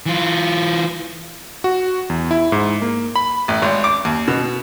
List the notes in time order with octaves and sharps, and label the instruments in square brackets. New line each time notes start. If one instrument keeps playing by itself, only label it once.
[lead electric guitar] E3 F4
[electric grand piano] F#4
E2
E4
G#2
A#3
B5
[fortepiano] A1
G#1
D6
D#2
B2